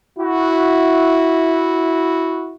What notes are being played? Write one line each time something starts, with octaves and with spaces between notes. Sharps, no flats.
E4 F#4